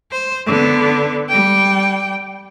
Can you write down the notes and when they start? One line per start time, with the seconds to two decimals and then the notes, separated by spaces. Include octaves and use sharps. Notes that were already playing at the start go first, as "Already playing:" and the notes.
0.11 C5
0.47 D3 B3
1.29 G3 G5